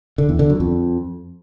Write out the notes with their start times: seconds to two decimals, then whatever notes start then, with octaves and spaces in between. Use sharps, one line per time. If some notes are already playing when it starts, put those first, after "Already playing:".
0.18 D3
0.29 E2
0.39 D3
0.50 F#2
0.60 F2